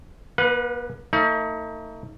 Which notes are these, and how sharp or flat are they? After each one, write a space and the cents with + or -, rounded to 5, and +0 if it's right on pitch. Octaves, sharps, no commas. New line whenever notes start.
A#3 +45 B4 +0 F#5 -45
A3 +45 D#4 +35